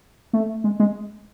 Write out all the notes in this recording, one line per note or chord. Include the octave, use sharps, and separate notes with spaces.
A3
G#3
G#3